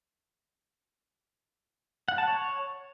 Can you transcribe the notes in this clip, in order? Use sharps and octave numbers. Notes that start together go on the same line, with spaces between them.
F#5
A5
C#5